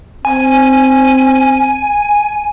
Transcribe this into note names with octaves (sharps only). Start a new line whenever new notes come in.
C4 G#5